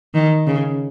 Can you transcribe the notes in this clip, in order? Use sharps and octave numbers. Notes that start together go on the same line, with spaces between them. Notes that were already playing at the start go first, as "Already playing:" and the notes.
D#3
C#3